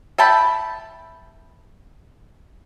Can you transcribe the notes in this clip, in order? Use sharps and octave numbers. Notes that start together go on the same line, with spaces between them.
E5 G5 A5 B5